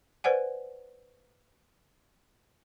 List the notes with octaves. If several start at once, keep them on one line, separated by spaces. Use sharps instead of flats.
B4 C5 D5 F#5 G#5